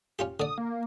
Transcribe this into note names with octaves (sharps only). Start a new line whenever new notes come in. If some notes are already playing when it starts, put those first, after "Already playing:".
C#4 F4 G4
D3 D5 D#6
A#3